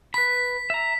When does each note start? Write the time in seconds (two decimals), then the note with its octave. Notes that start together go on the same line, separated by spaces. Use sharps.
0.14 B4 B5 B6
0.70 E5 A#5